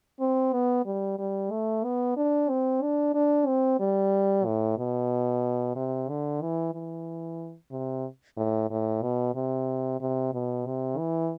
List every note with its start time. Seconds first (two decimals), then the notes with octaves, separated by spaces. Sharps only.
0.20 C4
0.53 B3
0.86 G3
1.19 G3
1.51 A3
1.84 B3
2.17 D4
2.49 C4
2.82 D4
3.14 D4
3.47 C4
3.80 G3
4.45 A2
4.78 B2
5.76 C3
6.09 D3
6.42 E3
6.74 E3
7.71 C3
8.37 A2
8.71 A2
9.02 B2
9.35 C3
10.01 C3
10.33 B2
10.67 C3
10.98 E3